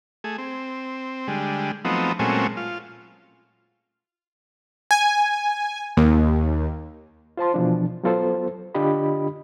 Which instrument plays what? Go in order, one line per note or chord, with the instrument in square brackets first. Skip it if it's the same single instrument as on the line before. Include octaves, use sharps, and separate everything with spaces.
[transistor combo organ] A3 G#4
C4
D3 G3 G#3
F3 F#3 A3 B3 C4 D#4
A#2 F#3 G#3 A3 C4 C#4
F4
[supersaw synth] G#5
D#2
[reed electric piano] F4 C5 A5 C6
B2 E3 F3 D4
F#3 B3 F4 A4 C5
D3 D4 F4 G4 D#5 B5